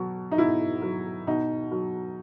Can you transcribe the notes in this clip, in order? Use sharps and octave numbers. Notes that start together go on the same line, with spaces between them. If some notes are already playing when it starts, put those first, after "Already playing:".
Already playing: B2 F#3
D#4
B2 E4
F#3
B2 D#4
F#3